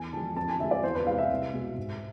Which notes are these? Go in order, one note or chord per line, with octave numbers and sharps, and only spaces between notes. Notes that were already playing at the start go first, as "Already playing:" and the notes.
Already playing: E2 G#5
D3 F3 G#3 A5
F2 A5
G#5
D3 G#3 E5
D5
E2 C5
B4
C3 G#3 F5
E5
C2
B2 G#3
G#2